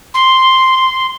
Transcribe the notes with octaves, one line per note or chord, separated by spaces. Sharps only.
C6